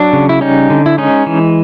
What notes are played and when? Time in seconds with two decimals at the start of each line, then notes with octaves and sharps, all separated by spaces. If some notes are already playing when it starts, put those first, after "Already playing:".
Already playing: F#3 D4
0.13 C#3
0.29 E4
0.41 G3 C#4 D#4
0.70 D3
0.86 E4
0.98 G#3 C#4 D#4
1.26 E3